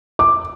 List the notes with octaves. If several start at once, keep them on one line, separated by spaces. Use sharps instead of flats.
D6